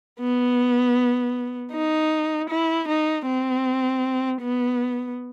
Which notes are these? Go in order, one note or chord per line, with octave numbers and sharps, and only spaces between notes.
B3
D#4
E4
D#4
C4
B3